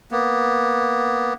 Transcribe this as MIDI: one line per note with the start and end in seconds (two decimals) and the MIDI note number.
0.11 1.34 58
0.11 1.34 59